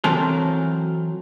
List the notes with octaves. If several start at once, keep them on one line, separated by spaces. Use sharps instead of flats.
E3 F#3 C4 A4 A#4 C5